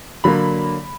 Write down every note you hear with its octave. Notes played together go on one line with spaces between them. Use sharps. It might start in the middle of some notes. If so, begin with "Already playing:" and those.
D3 F#3 A#3 B5